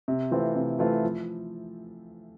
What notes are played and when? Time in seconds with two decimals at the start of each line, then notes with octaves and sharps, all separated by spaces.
0.08 C3
0.31 E3 A3 C4 F4
0.56 C3
0.79 E3 A3 C4 F4
1.04 F3